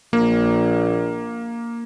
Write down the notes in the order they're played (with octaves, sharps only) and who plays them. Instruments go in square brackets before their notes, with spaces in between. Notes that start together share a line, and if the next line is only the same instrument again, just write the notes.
[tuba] A#1 [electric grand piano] A#3